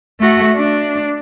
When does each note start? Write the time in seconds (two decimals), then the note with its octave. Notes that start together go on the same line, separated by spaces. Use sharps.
0.20 A3 F#4
0.55 D4